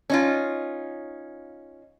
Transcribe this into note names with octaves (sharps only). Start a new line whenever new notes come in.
C#4 D#4 F4